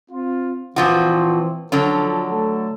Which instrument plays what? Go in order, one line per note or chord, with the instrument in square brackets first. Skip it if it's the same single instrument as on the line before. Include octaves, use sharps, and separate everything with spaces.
[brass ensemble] C4 F4
[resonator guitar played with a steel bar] A#2 F3 F#4 [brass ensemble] E3 C4
[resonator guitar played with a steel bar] D3 F#3 C#4 [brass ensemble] F3 A4
[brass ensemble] A3 A4